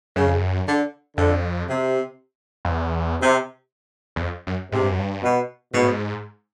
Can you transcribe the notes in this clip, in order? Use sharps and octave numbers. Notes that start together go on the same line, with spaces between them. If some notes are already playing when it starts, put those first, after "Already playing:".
F#2 C#3
F2
F#2
D3
F2 D3
C3
F2
E2
C3
E2
F2
F#2
G#2 C3
G2
F#2
G2
B2
G#2 B2
A2
G#2